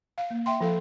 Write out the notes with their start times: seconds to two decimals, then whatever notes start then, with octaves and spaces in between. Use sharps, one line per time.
0.18 F5
0.30 A#3
0.46 E5 G5 C6
0.60 F3 A4 F5